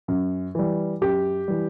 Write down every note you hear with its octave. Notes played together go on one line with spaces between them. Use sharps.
F#2
E3 G3
F#2 G4
E3 G3